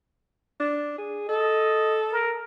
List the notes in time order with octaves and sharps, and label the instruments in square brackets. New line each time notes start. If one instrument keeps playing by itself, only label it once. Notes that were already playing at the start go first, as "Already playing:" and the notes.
[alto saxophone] D4
G#4
[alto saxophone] A4 [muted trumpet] D#5
[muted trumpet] A#4